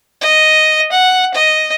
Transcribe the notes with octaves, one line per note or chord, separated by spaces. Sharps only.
D#5
F#5
D#5